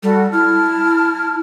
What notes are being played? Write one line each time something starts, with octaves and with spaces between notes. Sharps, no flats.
G3 F#4 A4
E4 A5 F6